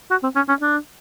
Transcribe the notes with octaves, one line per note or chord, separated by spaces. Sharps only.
F#4
C4
C#4
C#4
D4